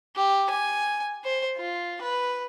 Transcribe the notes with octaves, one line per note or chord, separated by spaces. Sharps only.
G4
G#5
C5
F4
B4